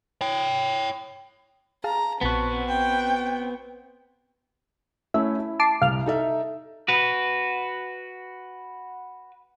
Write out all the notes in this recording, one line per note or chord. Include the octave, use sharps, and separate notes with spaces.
C#5 G5
G#4 F5 A5 A#5
A#1 B3 C4 F#4 A5 B6
G5
A3 C#4 E4 E5
E4
A5 D6 C7
C2 F5 F6
D#4 A4 E5
F#4 B4